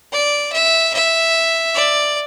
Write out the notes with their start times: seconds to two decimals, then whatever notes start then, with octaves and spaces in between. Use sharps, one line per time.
0.12 D5
0.53 E5
0.94 E5
1.75 D5